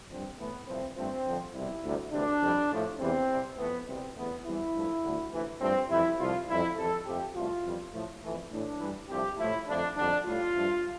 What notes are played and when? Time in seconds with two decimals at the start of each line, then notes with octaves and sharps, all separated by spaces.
0.09 G2 D3 F3 C4
0.38 A2 E3 A3 B3
0.67 C2 C3 F3 A3 C4
0.96 G2 F3 A3 C4
1.25 F2 D3 F3
1.54 C2 B2 G3 E4
1.83 D2 C3 G3
2.12 D2 C3 E3 D4
2.41 F2 C3 G3
2.71 A2 F3 A3
2.99 E2 C3 E3 G3 C4
3.29 C2 C3 G3
3.57 F2 E3 A3 B3
3.86 C2 B2 G3 C4
4.15 E2 D3 A3 B3
4.44 E2 C3 E3 G3 E4
4.74 G2 F3 A3
5.02 D2 D3 G3
5.32 D2 C3 E3
5.61 G2 F3 A3 C4
5.89 F2 C3 E3 E4
6.19 C2 C3 F3 A3 F4
6.48 F2 E3 G3 E4
6.77 F2 C3 E3 A4
7.05 F2 C3 F3 A3 G4
7.35 C2 B2 A3 F4
7.63 F2 E3 G3
7.93 A2 F3 A3
8.22 F2 E3 A3
8.51 A2 E3 A3 D4
8.80 G2 E3 G3
9.09 C2 C3 F3 A3 G4
9.38 A2 F3 A3 E4
9.67 F2 D3 F3 A3 D4
9.96 F2 D3 G3 D4
10.25 A2 G3 F4
10.54 G2 F3 A3